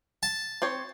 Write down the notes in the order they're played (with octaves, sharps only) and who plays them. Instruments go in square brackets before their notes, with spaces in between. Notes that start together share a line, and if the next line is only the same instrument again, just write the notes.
[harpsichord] A5
[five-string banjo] C4 C5 C#5